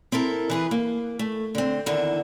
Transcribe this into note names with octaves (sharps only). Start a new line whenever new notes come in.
C4 E4 A4 A#4
E3 G#4 B4
A#3
A3
D3 C4
E2 D3 D#3 E4